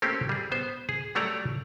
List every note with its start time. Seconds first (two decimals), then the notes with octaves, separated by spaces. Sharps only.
0.02 A3 A#3 C4 C#4 G4
0.29 G3 G#4
0.52 B3 C5
0.89 G#4
1.15 F#3 G3 A3 C#5 D5 A#5